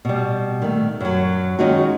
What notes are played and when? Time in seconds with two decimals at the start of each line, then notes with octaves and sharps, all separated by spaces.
0.05 B2 G3
0.62 D#3 A3
1.01 F#2 F#3
1.59 D#3 G#3 C#4 D#4 F4 F#4